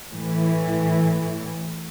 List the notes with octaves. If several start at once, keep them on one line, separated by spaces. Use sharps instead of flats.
A2 E3